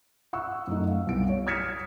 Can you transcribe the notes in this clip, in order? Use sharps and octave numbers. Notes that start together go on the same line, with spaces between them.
F#5 C#6 E6
F#2 A3 D#4
F5
C2 B3 D7
C#5
D#6 F6 G#6 B6 C#7 E7